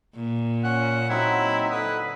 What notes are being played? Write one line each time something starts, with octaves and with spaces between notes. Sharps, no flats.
A#2
C#4 F#5
F#3 C4 D#4 E4
D3 B4 D#6